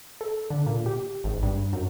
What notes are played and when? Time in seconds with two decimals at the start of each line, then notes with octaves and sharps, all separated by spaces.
0.21 A4
0.50 D3
0.66 A#2
0.86 G4
1.24 G#1
1.43 G2
1.73 F#2